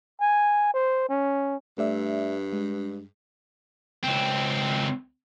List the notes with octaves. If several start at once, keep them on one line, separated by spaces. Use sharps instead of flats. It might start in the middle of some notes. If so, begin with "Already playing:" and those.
G#5
C5
C#4
G2 A3 D5 E5
G#3
C#2 C4